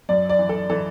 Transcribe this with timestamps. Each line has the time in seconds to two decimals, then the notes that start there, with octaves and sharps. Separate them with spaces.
0.09 F#2 D5
0.29 D5
0.39 E3
0.49 A4
0.70 E3 A4